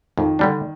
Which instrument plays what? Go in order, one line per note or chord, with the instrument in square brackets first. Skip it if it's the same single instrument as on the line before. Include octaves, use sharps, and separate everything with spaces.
[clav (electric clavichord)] F2 [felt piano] D#3
[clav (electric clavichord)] D3 G3 D4